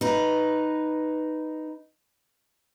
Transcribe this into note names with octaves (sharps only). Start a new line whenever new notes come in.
D#4 B4